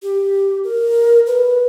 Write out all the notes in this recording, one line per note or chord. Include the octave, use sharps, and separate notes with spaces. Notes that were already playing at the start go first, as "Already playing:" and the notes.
G4
A#4
B4